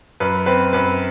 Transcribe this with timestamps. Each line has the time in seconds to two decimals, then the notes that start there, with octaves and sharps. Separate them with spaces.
0.20 F#2 B4
0.46 C4 B4
0.73 F#2 B4